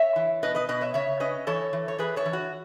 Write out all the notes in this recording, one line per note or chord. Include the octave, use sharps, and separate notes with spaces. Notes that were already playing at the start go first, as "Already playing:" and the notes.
Already playing: C#5 E5
E3
B2 B4 D#5
B4 D#5
B2 B4 D#5
C#5 E5
C#3 C#5 E5
C#4 B4 D#5
E3 A4 C#5
E3
C#5
E3 G#4 B4
A4 C#5
E3
F#4